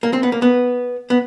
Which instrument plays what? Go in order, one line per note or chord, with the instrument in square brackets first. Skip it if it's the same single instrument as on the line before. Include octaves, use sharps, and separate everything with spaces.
[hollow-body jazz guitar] A#3
C4
B3
A#3
B3
B3